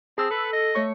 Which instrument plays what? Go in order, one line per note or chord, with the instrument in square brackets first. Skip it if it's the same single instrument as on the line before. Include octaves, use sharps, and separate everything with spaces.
[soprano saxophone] C4 [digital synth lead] G#4 [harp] A5 E6
[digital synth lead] A4 [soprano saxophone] B4
[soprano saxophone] D#5
[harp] A3 C#5 C#6